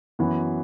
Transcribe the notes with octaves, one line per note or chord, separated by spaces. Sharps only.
F#2 E3 B3 F#4